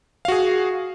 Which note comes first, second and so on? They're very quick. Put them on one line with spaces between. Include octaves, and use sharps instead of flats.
F5 F#4 G#4